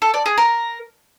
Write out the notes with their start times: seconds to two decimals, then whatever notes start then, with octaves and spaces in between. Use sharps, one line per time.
0.02 A4
0.14 D5
0.26 G#4
0.38 A#4